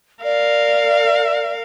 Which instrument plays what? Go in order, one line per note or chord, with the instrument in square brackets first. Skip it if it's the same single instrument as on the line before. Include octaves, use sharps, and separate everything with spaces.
[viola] A#4 F5 [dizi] D5